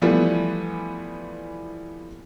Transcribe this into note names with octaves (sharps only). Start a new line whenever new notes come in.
E3 F3 G3 A3 B3